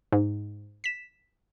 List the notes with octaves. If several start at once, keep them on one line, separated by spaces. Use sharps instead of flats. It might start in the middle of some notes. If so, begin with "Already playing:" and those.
G#2
B6 E7